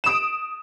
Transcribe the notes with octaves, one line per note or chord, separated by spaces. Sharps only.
D#6 D7 E7